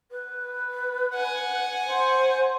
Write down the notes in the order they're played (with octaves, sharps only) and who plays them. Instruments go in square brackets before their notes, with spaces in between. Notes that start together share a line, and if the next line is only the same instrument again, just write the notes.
[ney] B4
[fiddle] F#5 G#5
[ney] C5